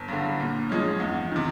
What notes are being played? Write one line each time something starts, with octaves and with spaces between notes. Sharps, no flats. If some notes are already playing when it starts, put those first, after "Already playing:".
Already playing: G1
G2 D3
A#2
F3 G#3 C#4
E2
C3 D#3